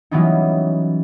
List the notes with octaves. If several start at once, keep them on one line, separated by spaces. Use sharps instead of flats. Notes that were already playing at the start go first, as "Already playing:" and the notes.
E3 F#3 G3 B3 C#4 D#4